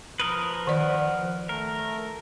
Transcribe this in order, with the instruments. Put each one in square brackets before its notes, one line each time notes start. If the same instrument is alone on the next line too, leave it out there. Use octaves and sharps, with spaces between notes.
[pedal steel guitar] F3 A#4 B4 [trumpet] D#6
[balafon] D#3 D5 [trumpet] F#5
[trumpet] A3 [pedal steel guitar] A#4